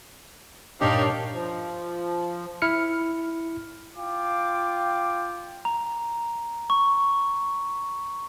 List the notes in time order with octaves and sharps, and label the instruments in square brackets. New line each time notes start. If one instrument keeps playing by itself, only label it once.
[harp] G2 A#2 A#3 [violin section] D4 C#5 F5 [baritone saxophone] D#4 [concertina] G4
[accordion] F3
[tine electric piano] E4 F6 C#7
[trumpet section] F4 G5 D6
[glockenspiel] A#5
C#6